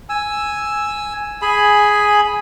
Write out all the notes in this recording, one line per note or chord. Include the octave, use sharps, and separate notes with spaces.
G#5 E6
G#4 G#5 B5